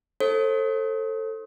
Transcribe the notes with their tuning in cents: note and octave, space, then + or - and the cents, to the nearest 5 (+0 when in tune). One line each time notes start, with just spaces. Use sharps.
D#4 +30 A4 +15 C5 +35